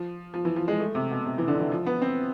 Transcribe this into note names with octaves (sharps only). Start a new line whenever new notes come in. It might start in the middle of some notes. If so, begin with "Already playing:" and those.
Already playing: F3
F3
E3
F3
G#3
A3
C3
B2
C3
E3
D3
E3
F3
B3
C4